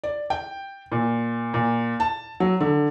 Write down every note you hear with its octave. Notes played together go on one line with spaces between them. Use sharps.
D5
G5
A#2
A#2
A5
F#3
D3